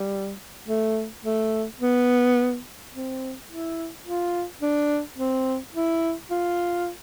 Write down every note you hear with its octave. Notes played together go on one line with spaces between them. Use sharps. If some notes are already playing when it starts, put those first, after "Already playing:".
Already playing: G3
A3
A3
B3
C4
E4
F4
D4
C4
E4
F4